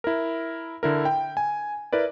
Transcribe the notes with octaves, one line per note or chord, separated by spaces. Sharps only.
E4 A#4
D3 E4 A#4
G5
G#5
E4 A#4 B4 D5